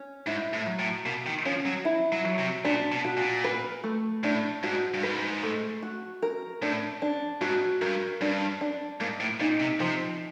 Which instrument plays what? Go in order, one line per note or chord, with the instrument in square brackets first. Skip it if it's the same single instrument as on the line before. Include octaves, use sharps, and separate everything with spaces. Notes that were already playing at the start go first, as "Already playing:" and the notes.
Already playing: [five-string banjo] C#4
[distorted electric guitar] G#2 [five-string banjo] E4
[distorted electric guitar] A2
[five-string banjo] F#3
[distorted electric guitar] A2
[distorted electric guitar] B2 [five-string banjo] A#3
[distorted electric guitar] D#3
[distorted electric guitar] F3 [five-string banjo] C#4
[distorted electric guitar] F#3
[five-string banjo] E4
[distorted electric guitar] F#3
[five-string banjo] F#3
[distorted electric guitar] C3
[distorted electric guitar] A#2 [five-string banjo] D4
[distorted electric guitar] B2
[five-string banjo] F#4
[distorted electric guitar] A#2
[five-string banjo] B4
A3
[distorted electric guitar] A2 [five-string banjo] D4
[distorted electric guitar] G#2 [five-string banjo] F#4
[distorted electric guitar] G2
[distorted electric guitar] G#2 [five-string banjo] B4
[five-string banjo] A3
F#4
A#4
[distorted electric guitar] A2 [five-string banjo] D4
[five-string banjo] D4
[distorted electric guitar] G#2 [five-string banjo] F#4
[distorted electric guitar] G2 [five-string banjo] A#4
[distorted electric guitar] G2 [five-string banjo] D4
[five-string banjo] D4
[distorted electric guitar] G#2 [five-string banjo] A#3
[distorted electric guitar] A2
[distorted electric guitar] A#2 [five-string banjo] D#4
[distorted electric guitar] C3
[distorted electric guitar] C3 [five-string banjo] F3